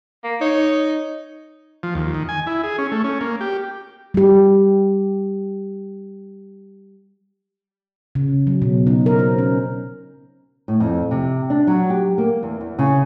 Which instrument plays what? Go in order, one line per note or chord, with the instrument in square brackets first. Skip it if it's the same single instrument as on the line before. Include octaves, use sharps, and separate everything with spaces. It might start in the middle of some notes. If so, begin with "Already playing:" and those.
[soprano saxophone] A#3
[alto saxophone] D#4 [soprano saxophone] C#5
[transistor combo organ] F3
D#2
D#3
G#5
E4
G#4
C#4
A3
C#4
A#3
G4
[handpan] G3 G4
C#3
F#3
B2
D#4
A#4
C5
C#4
[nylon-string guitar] A2
F2
C3
D4
F#3
G4
A#3
E2
E2
C#3